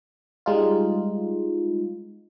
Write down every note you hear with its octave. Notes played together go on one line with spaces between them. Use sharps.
G3 G#3 D#4 F4